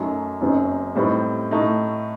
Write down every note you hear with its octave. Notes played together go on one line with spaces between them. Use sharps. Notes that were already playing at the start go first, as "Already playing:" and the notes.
Already playing: F#2 F#3 A3 D#4
F#1 F#2 F#3 C4 D#4
A2 G3 C4 D#4
A2 A3 D#4